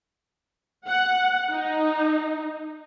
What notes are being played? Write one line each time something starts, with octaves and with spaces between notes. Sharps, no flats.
F#5
D#4